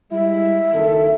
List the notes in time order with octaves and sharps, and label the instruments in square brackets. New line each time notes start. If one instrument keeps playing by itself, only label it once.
[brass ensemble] G3 G#3 E4 [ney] E5
[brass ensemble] F#1 D#3 A4